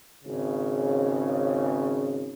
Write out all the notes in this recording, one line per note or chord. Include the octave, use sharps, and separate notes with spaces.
G#1 C#3